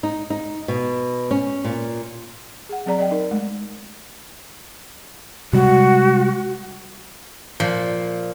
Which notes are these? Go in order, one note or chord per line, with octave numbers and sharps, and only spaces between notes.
D#4
D#4
B2
C#4
A#2
G#4 F#5
F#3 C4 G#4 D5 A#5
D5 D#5 G5
D#4 A#4
G#3 A3
C3 G3 G#3 F#4
A#2 F3